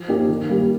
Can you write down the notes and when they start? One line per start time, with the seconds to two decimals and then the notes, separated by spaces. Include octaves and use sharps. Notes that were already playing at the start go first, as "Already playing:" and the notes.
Already playing: F3
0.08 A#3 D#4 G4
0.29 D#3
0.49 G3 A#3 G4